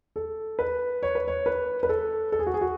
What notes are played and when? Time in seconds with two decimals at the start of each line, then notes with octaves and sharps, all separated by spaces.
0.16 A4
0.59 B4
1.03 C#5
1.15 B4
1.28 C#5
1.46 B4
1.83 B4
1.89 A4
2.32 A4
2.39 G#4
2.47 F#4
2.54 G#4
2.61 F#4